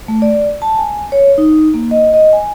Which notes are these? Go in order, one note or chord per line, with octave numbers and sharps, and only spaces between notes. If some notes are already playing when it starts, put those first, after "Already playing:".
A3
D5
A5
G#5
C#5
D#4
A#3
D#5
D#5
G#5